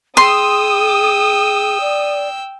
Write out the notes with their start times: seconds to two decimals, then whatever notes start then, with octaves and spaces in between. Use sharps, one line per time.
0.17 G#4 G5 C6 D#6 E6
1.81 D5